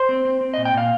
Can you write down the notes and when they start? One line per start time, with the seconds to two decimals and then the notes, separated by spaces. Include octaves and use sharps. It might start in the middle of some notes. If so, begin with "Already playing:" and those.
Already playing: C5
0.09 C4
0.25 C4
0.41 C4
0.54 A#2 D#5
0.65 G5
0.74 A#2 F5